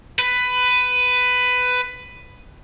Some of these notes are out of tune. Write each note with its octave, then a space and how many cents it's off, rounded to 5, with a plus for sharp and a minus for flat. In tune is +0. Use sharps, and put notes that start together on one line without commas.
B4 +15